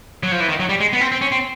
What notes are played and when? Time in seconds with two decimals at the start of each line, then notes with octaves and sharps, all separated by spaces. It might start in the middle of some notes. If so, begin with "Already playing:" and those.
0.23 F#3
0.32 F3
0.40 E3
0.49 D#3
0.60 F#3
0.69 G3
0.80 G#3
0.93 B3
1.01 C4
1.12 C4
1.21 C#4
1.32 C4